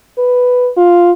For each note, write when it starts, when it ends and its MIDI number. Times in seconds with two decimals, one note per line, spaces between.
0.18 0.70 71
0.77 1.12 65